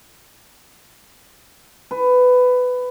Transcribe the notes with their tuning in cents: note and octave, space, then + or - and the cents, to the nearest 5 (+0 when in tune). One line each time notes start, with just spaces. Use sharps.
B4 +15